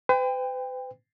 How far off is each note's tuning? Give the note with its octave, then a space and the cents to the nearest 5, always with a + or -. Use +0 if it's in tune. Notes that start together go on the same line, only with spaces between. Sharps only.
B4 +45 G5 +25